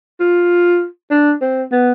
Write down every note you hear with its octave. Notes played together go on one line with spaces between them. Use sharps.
F4
D4
C4
B3